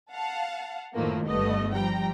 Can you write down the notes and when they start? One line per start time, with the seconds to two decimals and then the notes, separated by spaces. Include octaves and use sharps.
0.12 F5 F#5 A5
0.94 F#2 A2 D#3 F3 A3 A#3
1.27 G1 G2 A3 B3 D#5
1.72 F3 G3 G5 A#5